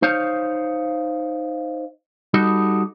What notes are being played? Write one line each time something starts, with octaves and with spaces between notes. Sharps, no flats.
D#4 C5 C#5 F5
G3 D#4 F#4 A4 D#5